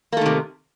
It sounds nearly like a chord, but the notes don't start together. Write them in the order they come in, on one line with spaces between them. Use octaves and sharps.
A#3 A3 D#3 C3